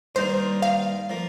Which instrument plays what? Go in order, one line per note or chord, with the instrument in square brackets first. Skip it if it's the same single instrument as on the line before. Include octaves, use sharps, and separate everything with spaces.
[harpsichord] G2 D#3 A#3 D#4 [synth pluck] C5
[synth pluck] F5
[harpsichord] F3 A#3